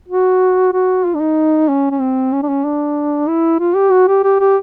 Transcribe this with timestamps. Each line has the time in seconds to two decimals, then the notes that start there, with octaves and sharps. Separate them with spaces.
0.08 F#4
0.73 F#4
1.05 F4
1.15 D4
1.20 D#4
1.69 C#4
1.91 C#4
2.00 C4
2.33 C#4
2.43 D4
2.49 C#4
2.64 D4
3.29 E4
3.60 F4
3.75 G4
3.91 F#4
4.08 G4
4.24 G4
4.40 G4